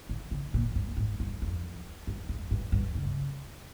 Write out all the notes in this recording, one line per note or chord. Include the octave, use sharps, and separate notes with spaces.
D#3
C#3
A#2
G2
G#2
G2
F2
G2
F2
G2
G2
C#3